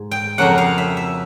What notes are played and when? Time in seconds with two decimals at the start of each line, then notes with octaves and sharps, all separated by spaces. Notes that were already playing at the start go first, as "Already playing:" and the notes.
Already playing: G#2
0.11 G5
0.38 F2 C#3 F#3 A#3 C#4 F#5
0.58 F5
0.78 E5
0.97 E5